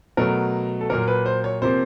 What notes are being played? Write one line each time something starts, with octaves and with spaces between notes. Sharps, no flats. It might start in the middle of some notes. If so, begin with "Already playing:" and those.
B2 F#3 A3 A#4
A4
A#2 F#3 A#3 A#4
B4
C5
C#5
C3 F3 A#3 C5